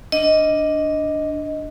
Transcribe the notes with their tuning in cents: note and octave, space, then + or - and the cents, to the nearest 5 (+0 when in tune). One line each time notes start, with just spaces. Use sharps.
D4 +0 D#5 +5